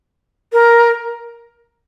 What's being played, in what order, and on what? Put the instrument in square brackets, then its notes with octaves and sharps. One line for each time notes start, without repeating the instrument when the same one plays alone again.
[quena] A#4